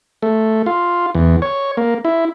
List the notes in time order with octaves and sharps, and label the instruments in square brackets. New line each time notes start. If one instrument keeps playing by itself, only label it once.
[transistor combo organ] A3
F4
E2
C#5
A#3
E4